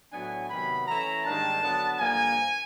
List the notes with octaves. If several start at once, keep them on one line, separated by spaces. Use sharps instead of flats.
A2 F#3 B3 D4 G#5
C3 D#3 F#3 B3 B5
E3 A3 C#4 E4 A#5
G#2 D#3 G3 A#3 D4 A5
D3 F#3 B3 D4
G2 D3 F3 A#3 G#5